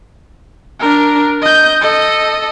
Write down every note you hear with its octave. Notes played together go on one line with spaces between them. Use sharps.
D4 A#4
D#5 G6
A4 D#5